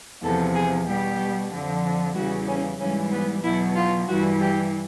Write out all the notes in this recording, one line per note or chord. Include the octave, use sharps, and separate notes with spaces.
E2 C3 F3 A4
G#4
B2 G3 G4
F2 D3 F3
E2 C#3 E3 G3 F#4
C#4
G#2 E3 G3 C#4
B3
E2 B2 F#3 E4
F4
G2 E3 G3 F#4
G4